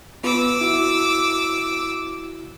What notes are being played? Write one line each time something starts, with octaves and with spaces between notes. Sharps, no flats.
B3 F4 B4 D6 E6
E4 F#4